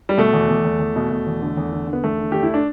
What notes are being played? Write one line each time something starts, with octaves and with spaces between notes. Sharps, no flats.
G3
B2 A3
E2
E2
E2
E2
B2
B2
E2
D3
E2
D3
D3
B3
E2 A3
D3
E2 G4
E4
D4